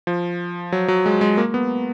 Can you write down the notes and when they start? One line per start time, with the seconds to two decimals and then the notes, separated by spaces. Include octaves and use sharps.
0.07 F3
0.72 F#3
0.88 F#3
1.06 G#3
1.21 G#3
1.38 A#3
1.54 B3